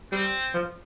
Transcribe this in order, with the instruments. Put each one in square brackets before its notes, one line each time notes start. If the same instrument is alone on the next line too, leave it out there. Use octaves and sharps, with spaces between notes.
[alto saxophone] G3 [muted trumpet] C4
[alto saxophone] F3